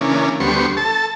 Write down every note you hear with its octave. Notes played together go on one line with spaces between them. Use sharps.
C#3 E3 A#3 C#4 D4
D2 G3 B3 C5 C#6
A4 A5